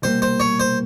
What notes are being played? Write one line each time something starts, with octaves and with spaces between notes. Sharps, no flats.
C2 B2 G3 A#3 C5
C5
C#5
C5